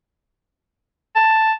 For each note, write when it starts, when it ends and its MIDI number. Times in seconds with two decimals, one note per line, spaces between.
1.16 1.53 81